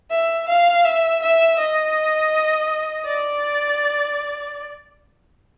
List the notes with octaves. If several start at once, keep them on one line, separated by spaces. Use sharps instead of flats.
E5
F5
E5
E5
D#5
D5